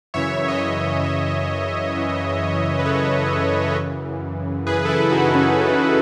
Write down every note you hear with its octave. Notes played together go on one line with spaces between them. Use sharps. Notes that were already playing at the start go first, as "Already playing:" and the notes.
F#2 C#3 E3 C#5 E5
D#5
C#5 E5
F#2 C#3 E3 C#5 E5
F#2 C#3 E3
B4
F#2 C#3 E3 A4 C#5
F#2 C#3 E3
F#2 C#3 E3 G#4 B4
A4
E4 G#4
D#4 F#4
C#4 E4
F#2 C#3 E3 D#4